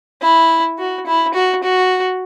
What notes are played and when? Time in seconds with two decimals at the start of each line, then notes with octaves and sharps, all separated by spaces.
0.22 E4
0.79 F#4
1.06 E4
1.34 F#4
1.63 F#4